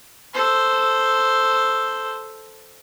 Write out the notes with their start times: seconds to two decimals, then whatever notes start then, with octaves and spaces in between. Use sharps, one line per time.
0.34 A4 C5